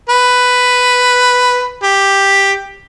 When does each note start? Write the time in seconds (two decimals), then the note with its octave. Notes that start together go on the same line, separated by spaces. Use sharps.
0.09 B4
1.83 G4